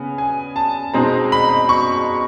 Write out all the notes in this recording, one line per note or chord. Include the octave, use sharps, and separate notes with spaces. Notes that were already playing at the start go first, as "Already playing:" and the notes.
Already playing: C#3 B3 G#5
G#5
A5
B2 G#3 C4 D#4 A#5
B5
C#6